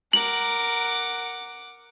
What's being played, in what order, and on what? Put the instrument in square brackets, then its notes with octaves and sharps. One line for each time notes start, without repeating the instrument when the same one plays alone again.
[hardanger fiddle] A#4 [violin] F#5 D6 [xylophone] F#7